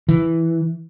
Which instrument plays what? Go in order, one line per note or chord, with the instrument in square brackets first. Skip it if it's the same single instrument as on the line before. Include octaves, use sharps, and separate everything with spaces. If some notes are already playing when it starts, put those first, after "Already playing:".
[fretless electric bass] E3